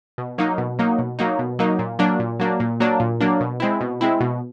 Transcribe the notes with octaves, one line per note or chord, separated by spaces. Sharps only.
B2
F#3 A#3 D#4
B2
F#3 A#3 D#4
B2
F#3 A#3 D#4
B2
F#3 A#3 D#4
A#2
F#3 A#3 D4
A#2
F#3 A#3 D4
A#2
F#3 A#3 D4
A#2
F#3 A#3 D4
B2
G#3 C4 E4
B2
G#3 C4 E4
B2